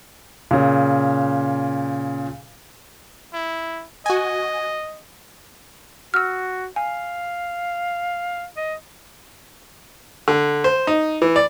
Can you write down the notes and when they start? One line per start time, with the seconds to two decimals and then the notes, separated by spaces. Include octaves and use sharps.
0.51 A#2 C#3
3.33 E4
4.06 F#4 D#5 G#5
6.14 F#4 E6 F6
6.76 F5 G#5
8.56 D#5
10.28 D3
10.64 C5
10.87 D#4
11.22 E3
11.36 D5